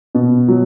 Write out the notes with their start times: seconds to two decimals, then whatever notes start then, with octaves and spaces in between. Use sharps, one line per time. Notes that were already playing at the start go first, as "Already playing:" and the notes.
0.15 B2
0.48 F#3